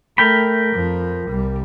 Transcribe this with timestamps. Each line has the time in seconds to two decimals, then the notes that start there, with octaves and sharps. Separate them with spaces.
0.18 A3 A#4 G5 B5
0.74 F2 F3
1.29 C2 G3